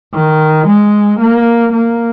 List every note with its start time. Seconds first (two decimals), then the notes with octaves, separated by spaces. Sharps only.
0.13 D#3
0.67 G#3
1.19 A#3
1.72 A#3